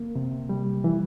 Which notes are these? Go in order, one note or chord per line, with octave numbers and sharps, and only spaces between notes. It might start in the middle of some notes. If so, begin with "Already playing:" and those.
Already playing: A#3
C3
G3
E3